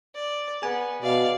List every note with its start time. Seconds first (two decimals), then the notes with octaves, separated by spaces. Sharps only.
0.15 D5
0.62 B3 G#4 G#5
1.02 B2 D5 F5